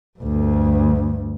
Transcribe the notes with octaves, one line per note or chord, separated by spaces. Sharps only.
D2 G2